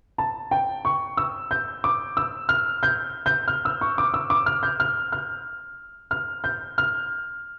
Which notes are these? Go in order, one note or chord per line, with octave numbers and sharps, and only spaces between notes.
A5
G5
C#6
E6
G6
D6
E6
F6
G6
G6
F6
E6
C#6
D6
E6
D6
F6
G6
F6
F6
F6
G6
F6